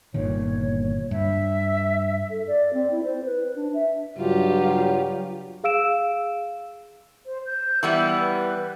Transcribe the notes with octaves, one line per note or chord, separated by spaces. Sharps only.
G1 A#2 D#3 C#5
G2 E5
A4
D5
C4
E4
C5
B4
D4
E5
G2 C#3 F#3 F4 G4
G#4 F5 E6 D7 E7
C5
G6
E3 G3 B3 E6
B4